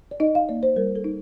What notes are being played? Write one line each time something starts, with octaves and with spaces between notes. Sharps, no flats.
D5
D#4 D#5
F5
A#3 D5
C5
G3 A#4
A4
D#4